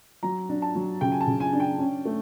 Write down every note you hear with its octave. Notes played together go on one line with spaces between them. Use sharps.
F#3 A#5
D4
A5
F#3
C#3 G5
G#5
A5
C#3
G#5
D4
G5
C#4
A3